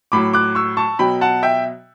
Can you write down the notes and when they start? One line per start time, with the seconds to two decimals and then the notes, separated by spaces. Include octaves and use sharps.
0.12 A2 F#3 B5 D6
0.33 D6 F#6
0.55 C#6 E6
0.77 A5 C#6
0.99 B2 F#3 G5 B5
1.21 F#5 A5
1.43 E5 G5